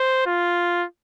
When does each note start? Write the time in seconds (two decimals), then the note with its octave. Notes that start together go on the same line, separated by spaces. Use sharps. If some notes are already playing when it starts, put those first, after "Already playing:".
Already playing: C5
0.26 F4